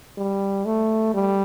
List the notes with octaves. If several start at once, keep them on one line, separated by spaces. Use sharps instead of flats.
G3
A3
G3